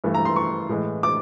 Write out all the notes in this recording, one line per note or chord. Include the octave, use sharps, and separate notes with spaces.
G2 E3 A3
A#5
C6
C#6
A2 E3 G#3
D6